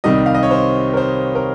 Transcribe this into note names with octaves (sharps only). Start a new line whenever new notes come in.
C2 C3 D#3 G3 D#5
F5
D#5
C#5
C5
A#4
C5
A#4